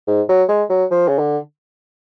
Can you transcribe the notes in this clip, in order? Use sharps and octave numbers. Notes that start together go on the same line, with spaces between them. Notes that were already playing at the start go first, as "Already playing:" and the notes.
G#2
F#3
G#3
F#3
F3
C#3
D3